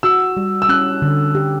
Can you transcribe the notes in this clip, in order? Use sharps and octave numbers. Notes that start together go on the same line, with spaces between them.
F#4 E6
G3
E6
C#4 F#6
D3
G4